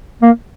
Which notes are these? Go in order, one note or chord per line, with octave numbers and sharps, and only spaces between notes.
A#3